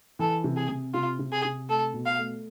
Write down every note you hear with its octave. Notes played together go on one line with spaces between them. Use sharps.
E3 A4
C3
G#4
C3
C3 F4
C3
G#4
C3
A3 A4
B2
F5
A3